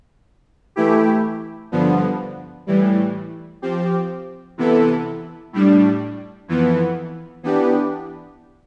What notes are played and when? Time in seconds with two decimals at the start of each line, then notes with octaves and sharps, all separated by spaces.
0.76 E3 A3 E4 G4
1.72 G2 D3 F3 B3
2.67 A2 E3 G3
3.62 F3 C4 G4
4.58 C3 E3 B3 E4 A4
5.53 A2 G3 D4
6.48 F2 E3 B3
7.43 E3 B3 D4 G4